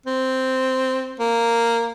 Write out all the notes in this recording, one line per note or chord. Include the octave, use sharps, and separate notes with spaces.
C4
A#3